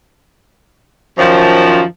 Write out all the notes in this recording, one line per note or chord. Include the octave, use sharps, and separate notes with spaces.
F#2 D#3 F3